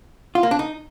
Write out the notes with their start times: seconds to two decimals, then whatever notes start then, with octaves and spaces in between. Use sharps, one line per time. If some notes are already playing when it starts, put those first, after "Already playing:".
0.35 F4
0.43 A#3
0.51 D4
0.59 D#4